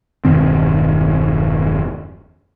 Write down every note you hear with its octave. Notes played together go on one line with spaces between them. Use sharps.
E1 G2 D#3 C4